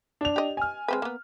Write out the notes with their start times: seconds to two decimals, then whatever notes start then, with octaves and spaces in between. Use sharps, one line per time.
0.21 D4 F7
0.36 G4 D#5
0.57 G#5 F6
0.88 G#3 C4 B4
1.02 A#3 B3